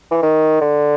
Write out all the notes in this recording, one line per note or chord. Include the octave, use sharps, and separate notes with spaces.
E3
D#3
D3